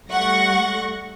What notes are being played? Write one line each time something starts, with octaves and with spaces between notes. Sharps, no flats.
G3 A3 F#5 C#6 A#6